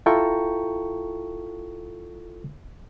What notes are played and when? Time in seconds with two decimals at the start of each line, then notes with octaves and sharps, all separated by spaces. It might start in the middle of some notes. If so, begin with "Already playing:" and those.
0.06 E4 F4 A4 G5 A#5 C#6